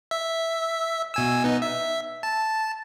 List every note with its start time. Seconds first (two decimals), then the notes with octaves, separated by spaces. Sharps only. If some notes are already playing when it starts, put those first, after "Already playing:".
0.11 E5
1.14 B2 G#5 E6
1.44 B3 D#4
1.62 E5
2.23 A5